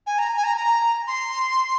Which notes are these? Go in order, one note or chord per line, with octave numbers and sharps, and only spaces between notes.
G#5
A#5
G#5
A#5
A#5
C6